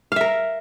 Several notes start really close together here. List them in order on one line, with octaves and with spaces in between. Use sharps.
F5 E5 A#4